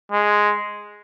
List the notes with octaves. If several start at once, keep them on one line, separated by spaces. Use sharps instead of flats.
G#3